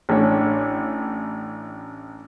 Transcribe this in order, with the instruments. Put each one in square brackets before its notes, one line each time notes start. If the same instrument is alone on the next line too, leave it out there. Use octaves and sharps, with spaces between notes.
[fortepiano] A1 D4 C#5